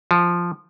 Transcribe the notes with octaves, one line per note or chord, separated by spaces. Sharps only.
F3